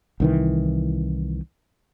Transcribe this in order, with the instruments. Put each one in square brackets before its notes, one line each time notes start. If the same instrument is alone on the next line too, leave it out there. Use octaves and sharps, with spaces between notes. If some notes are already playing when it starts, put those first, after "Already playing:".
[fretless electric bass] C2 D#3 E3